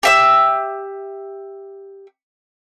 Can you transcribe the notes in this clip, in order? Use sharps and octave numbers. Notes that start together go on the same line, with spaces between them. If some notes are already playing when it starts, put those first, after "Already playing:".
G4 E5 E6